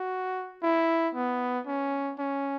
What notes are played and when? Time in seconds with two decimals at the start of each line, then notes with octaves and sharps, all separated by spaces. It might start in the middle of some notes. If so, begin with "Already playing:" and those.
Already playing: F#4
0.63 E4
1.15 B3
1.67 C#4
2.19 C#4